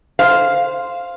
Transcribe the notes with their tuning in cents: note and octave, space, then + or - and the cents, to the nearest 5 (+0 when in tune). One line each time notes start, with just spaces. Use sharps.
C5 +0 F5 +0